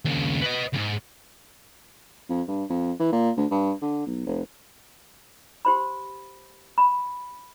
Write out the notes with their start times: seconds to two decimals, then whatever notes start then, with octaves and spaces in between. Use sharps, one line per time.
0.05 D#2 C#3
0.41 B4 D#5
0.73 D2 G#2
2.29 F2
2.48 G2
2.69 F2
3.00 E3
3.12 A#2
3.37 D2
3.51 G2
3.81 D3
4.06 B1
4.26 F1
5.65 G4 C5 B5
6.78 B5